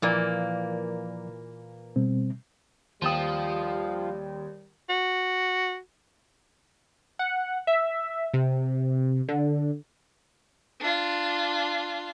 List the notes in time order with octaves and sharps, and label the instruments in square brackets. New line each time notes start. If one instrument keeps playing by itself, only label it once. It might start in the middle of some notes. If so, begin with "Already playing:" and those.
[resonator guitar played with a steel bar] A#2 E3 A#3 [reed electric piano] F3 D5
[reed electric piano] B2 G3 C4
[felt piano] D#2 G5 D#6 [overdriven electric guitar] F3 [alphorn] G3 [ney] F5
[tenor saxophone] F#4
[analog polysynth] F#5
E5
C3
D3
[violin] D4 F4